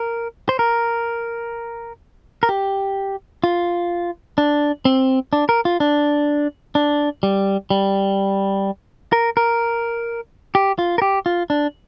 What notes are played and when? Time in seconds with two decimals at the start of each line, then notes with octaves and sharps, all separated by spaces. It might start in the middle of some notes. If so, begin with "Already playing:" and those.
Already playing: A#4
0.49 C5
0.59 A#4
2.43 A#4
2.49 G4
3.44 F4
4.38 D4
4.85 C4
5.33 D4
5.49 A#4
5.65 F4
5.80 D4
6.75 D4
7.23 G3
7.70 G3
9.12 A#4
9.37 A#4
10.55 G4
10.79 F4
10.98 A#4
11.02 G4
11.26 F4
11.50 D4